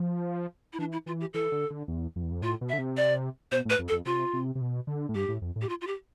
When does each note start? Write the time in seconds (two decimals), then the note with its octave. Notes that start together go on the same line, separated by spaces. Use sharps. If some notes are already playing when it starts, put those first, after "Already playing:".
Already playing: F3
0.73 E4
0.79 E3 D4
0.92 E4
1.06 E3 F4
1.21 G4
1.34 E3 A4
1.52 D3
1.70 D3
1.88 E2
2.16 F2
2.23 E2
2.31 F2
2.42 A2 F4
2.61 B2
2.69 E5
2.73 D3
2.78 C3
2.97 D5
3.52 B2 C5
3.65 A2 B4
3.79 F2
3.88 A4
3.92 F2
4.06 C3 F4
4.34 C3
4.55 C3
4.61 B2
4.87 D3
5.09 A2
5.15 G2 G4
5.28 A2
5.42 F2
5.56 A2
5.62 G4
5.69 F4
5.81 F4
5.87 G4